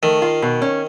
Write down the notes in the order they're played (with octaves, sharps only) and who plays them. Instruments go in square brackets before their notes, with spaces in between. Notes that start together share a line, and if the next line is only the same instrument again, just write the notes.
[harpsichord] D#3 [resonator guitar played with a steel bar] A3
[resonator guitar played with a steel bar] F4
B2
C#4